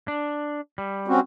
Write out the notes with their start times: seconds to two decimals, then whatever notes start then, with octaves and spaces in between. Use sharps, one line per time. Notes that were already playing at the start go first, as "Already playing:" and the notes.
0.08 D4
0.78 G3
1.08 C4 C#4 F#4